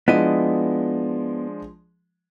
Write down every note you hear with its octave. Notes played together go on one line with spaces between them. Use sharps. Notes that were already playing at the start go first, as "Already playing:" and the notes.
F3 G#3 B3 D4 E4 D#5